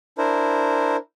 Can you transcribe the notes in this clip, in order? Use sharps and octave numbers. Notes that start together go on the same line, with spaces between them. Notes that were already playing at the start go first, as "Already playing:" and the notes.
D4 E4 A#4 C5